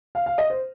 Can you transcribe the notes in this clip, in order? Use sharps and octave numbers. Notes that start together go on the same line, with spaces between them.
F5
F5
D#5
C5